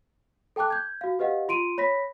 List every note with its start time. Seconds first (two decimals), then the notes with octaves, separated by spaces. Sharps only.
0.56 A4 G5 A5 D6 F#6
0.70 G6 G#6
1.01 F#4 F5
1.19 G4 B4 D#5 F5 F#5
1.48 F4 C6 D7 D#7
1.78 C#5 B5 A#6 B6